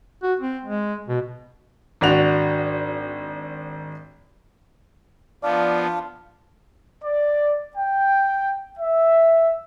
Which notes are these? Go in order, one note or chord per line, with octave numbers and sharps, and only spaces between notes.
F#4
C4
G#3
B2
G#1 D4 F#4 F7
F3 B3 D4 F4 D5 F5
D5
G5
E5